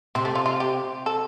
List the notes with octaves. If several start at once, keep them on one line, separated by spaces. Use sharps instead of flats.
C3 C4
A3
F4
F4
G4
A4